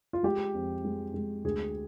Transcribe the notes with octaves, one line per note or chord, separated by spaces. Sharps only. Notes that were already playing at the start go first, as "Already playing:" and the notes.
F4
G#3 G4
F2
G#3
G#3
D2 G#4